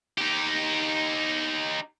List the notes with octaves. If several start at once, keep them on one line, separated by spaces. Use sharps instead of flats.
D#4 G4